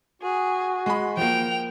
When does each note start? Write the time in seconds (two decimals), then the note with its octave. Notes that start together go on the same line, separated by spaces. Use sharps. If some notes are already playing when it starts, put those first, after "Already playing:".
0.22 F#4 G#4
0.86 G#3 B5
1.17 F3 A#3 G5 F7